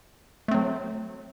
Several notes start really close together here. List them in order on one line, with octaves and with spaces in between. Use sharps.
A3 C4 F#3